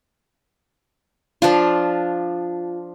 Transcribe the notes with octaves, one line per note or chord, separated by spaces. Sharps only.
F3 D4 F4